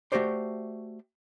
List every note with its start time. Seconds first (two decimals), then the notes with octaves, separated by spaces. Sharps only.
0.12 A3 B3 F#4 G4 C5 D5